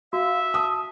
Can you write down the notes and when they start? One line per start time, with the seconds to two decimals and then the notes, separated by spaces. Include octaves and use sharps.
0.13 F#4 E5 F5
0.54 A5 D#6